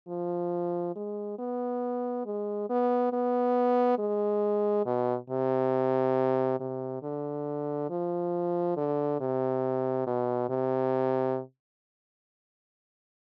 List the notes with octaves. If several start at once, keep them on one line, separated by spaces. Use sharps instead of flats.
F3
G#3
B3
G#3
B3
B3
G#3
B2
C3
C3
D3
F3
D3
C3
B2
C3